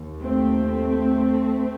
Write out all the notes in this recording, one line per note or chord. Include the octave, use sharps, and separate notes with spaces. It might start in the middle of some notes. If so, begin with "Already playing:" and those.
Already playing: D#2
A3 C4